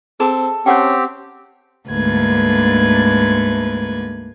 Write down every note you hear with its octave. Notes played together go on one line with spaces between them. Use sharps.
C4 G#4 A4
C4 C#4 G4 C#5 F#5 G5
D2 G#2 D3 A#3 B4 G#6